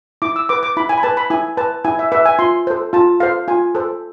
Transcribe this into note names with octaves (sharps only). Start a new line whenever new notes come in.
E4 D6
E6
B4 D6
D6
E4 B5
G#5
B5
B4 A5
B5
E4 G#5
B4 A5
E4 G#5
E5
B4 E5
G#5
F4 C6
A4 C5
F4 A5
A4 C5 F5
F4 G#5
A4 C5